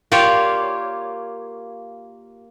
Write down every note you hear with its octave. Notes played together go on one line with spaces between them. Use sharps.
A#3 F4 G4 C#5 D5